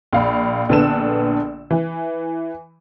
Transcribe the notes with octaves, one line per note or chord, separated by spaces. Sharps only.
A#1 F5 B5
A#1 D3 B3 D4 E6 E7
E3